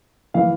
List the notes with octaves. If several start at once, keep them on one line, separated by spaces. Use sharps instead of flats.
E3 F5